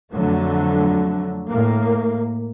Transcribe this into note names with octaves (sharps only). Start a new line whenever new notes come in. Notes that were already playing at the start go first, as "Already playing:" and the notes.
F2 D3 F#3 A3
A2 A#3